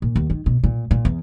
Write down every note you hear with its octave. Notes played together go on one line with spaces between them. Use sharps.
A#2
D#2
D#3
B2
A#2
A#2
E2